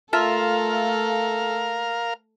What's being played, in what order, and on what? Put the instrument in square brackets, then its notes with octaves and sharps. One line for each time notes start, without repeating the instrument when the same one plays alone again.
[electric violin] A3 A4 [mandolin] F4 E5 A5 [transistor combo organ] A#4 F5